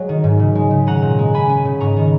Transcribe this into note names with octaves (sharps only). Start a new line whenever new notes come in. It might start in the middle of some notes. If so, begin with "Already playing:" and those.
Already playing: F#3 G#3 C#5
D#3
G#2
C#3
G#3
C#3
C#4 F#5 A#5
A#2
G#3
C#4 G#5 B5
C#4
C#3
G#2 A#5 C#6
D#3